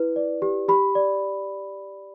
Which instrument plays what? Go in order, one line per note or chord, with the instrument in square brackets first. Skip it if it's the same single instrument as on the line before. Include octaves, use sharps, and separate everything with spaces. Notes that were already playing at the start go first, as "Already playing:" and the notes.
Already playing: [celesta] E4 B4
D5
G4
G4 B5
D5